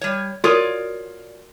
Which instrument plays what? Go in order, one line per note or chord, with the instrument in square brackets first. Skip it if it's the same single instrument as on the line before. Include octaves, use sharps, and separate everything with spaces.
[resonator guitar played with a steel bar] G3 C#5
[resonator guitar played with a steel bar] F4 C#5 D5 [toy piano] F#4 A#4 D#6